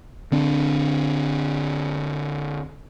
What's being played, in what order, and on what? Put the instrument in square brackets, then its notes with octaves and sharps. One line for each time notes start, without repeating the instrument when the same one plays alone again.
[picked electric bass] D3 C4 D4